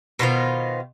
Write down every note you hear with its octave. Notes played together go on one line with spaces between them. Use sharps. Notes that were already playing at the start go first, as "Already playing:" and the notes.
B2 D#3 F4 C5